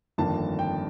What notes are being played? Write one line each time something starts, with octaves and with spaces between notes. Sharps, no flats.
G1 F2 D#3 A#3 D4 A5
G5